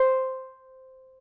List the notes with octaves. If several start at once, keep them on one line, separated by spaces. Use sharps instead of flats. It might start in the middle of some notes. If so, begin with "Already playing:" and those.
Already playing: C5